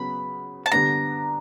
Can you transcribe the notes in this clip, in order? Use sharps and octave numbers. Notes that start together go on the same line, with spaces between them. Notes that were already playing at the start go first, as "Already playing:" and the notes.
Already playing: C#3 F#3 B3 B5
A5
D3 G3 B3 D4 A#5